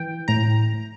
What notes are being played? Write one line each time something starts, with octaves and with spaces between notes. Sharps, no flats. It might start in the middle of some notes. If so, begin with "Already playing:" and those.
Already playing: E3 G5
A2 A#5